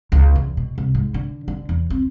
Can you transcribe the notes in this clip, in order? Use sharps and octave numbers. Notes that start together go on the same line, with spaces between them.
C#2
E2
B2
C2
G#2
D3
D3
E2
C4